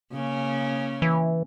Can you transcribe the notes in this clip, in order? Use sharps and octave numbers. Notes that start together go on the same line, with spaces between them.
C#3 A#3 C#4
E3